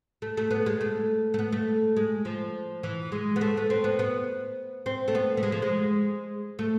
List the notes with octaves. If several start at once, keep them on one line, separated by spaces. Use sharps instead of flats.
A3
A3
B3
G#3
A3
A3
B3
A3
G#3
F3
E3
G#3
B3
A3
B3
C4
B3
B3
C4
A3
B3
A3
G#3
F3
G#3
A3